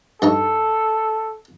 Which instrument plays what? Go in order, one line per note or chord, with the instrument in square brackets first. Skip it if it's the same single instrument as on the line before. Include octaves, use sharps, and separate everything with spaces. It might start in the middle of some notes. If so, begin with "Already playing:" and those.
[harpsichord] G2 D#4 C#6 [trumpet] A4